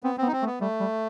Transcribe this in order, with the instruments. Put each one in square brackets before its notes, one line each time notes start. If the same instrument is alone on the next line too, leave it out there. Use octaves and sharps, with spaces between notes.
[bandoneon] B3 [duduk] C4
[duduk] B3 [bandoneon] C4
[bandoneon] D#4
C4
[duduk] A3
[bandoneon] B3
[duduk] G3 [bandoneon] A3
[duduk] G3